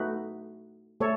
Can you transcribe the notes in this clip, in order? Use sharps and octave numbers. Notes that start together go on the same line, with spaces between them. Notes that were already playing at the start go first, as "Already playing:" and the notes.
Already playing: A3 D#4 F#4 B4
A3 A4 C#5